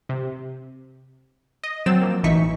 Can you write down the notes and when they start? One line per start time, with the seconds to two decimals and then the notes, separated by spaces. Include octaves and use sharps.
0.09 C3
1.63 D#5
1.86 F#3 C4 E6 A6 E7
2.01 F3 A#3
2.23 A1 B2 E3 D#4 C#6 B6